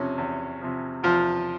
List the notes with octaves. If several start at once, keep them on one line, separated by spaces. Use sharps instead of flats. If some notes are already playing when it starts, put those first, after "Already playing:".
Already playing: E2 C3 F3 C#4
E2
C3 F3
E2 F3 F4